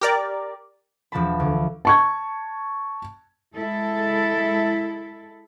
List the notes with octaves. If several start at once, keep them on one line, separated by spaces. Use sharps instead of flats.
G4 A#4 D5
E1 F3 A5 B5
D2
A5 C#6 G#6
G#3 E4 A4